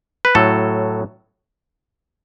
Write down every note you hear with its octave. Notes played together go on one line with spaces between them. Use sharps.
B4
A2 F#3 A4